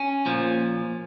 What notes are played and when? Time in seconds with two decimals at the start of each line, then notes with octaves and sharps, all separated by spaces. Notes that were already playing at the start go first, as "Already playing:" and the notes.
Already playing: C#4
0.26 A#2 F3